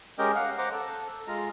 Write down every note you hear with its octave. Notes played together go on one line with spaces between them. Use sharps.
G#3 C#4 G4 A#4 D#5 G5
F5 F#5
C5 F#5 A#5 D6
A4
G#3 F4 A#5